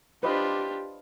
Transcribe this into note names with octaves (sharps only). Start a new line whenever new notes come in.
D4 F4 G4 B4 C5 D#5